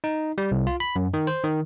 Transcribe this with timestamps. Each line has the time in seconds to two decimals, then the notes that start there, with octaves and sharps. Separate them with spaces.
0.04 D#4
0.38 G3
0.52 C2
0.67 F4
0.80 B5
0.96 F#2
1.14 D#3
1.27 C5
1.44 D#3